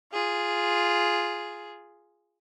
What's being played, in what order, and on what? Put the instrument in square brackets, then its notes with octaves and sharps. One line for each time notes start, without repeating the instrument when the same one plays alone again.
[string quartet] F4 G#4